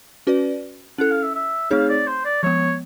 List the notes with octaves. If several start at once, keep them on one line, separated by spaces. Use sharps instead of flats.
C#4 F#4 B4 D5
C#4 E4 A4 F#5
F5
E5
E5
A3 C4 D#4 G#4 C#5 F5
D5
C5
D5
F3 G#3 B3 C#5